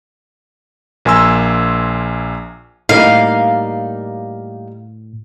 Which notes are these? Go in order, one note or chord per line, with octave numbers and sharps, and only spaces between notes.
A#1 A#3 G#5 C6 E6
A2 G3 A#3 D#4 F5